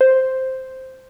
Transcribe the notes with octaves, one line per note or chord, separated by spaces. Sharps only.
C5